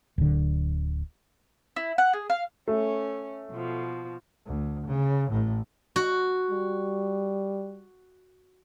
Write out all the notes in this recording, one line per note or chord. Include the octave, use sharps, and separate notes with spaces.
D1 D3
E4
F#5
G#4
F5
A3 C#4
B2 F3
D2
C#3
A1 A2
F#4
G3